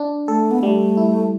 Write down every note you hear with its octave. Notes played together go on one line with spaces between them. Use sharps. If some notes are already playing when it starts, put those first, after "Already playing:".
Already playing: D4
A3 A4
B3
G3 A3
E4